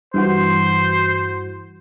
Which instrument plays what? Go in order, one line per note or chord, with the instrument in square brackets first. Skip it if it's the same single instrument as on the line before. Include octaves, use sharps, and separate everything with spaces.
[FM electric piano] G2 E3 F#4 [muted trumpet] C5